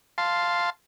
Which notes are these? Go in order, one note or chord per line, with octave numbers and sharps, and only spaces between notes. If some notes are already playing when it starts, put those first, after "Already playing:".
F5 A5 C6